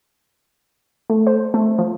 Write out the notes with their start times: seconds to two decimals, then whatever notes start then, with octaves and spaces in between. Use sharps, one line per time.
1.10 A3
1.27 C5
1.54 A3
1.78 F3